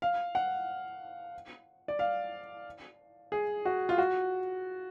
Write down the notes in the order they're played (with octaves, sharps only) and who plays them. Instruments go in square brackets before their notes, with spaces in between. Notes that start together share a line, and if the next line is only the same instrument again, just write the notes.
[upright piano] F5
F#5
D5
F5
G#4
F#4
F4
F#4